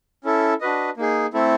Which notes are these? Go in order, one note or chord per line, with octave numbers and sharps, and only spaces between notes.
C#4 E4 A4
D4 F#4 B4 D#5
A#3 D#4 G#4
A3 C4 E4 A4